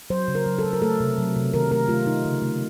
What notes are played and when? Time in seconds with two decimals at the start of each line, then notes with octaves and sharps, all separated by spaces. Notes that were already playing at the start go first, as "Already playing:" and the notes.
0.10 F#3 C5
0.28 C#3
0.35 A#4
0.46 F#3
0.59 A4
0.64 F#3
0.73 A#4
0.82 A3 A4
1.00 C3
1.18 F#3
1.36 C3
1.54 D#3 A#4
1.71 A3 A#4
1.88 A3 F4
2.06 A3 D#4
2.25 C#3
2.42 A3